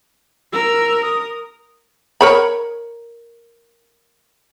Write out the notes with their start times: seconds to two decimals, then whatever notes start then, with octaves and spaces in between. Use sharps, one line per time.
0.53 A#4 E6
1.02 D#6
2.21 A#4 C#5 B5